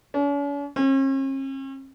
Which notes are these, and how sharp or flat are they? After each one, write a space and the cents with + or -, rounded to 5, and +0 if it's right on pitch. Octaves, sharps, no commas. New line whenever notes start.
C#4 +45
C#4 -45